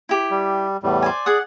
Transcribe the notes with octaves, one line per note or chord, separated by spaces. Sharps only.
E4 G4
G3
E2 A2 G3
C5 D5 G#5
G#4 D5 F#5 D#6